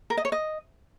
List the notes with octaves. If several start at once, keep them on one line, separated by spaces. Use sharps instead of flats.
A#4
D#5
C#5
D#5